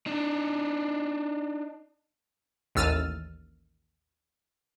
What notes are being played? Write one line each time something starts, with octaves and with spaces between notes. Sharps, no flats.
D4 D#4
A1 D#2 E6 F6 A6 D#7